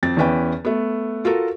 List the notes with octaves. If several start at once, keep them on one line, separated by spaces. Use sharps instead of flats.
F2 C4 A6
E2 E3 C#4 B4 G5
A3 B3
F4 F#4 A4 A#4